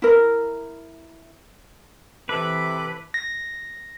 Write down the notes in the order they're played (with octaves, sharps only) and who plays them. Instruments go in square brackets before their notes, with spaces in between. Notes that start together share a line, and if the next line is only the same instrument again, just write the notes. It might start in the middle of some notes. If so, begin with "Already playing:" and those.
[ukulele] E4 A#4
[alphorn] C3 [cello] E3 [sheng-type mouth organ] A4 D6 [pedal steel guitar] B4
[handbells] A#6